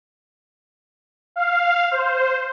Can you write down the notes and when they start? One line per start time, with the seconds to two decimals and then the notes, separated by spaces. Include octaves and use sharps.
1.36 F5
1.91 C5